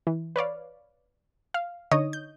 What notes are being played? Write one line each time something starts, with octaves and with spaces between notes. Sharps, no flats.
E3
B4 C#5 D5 F5
F5
D3 D#4 C#5 D#5 D#6
G6